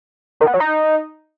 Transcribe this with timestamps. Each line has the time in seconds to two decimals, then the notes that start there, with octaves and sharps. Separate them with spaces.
0.40 D#3
0.47 B3
0.54 F#3
0.60 D#4